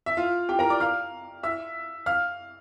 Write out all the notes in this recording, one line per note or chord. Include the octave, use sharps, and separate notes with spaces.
E5
F4 F5
G4 G5
A#4 A#5
D5 D6
F5 F6
E5 E6
F5 F6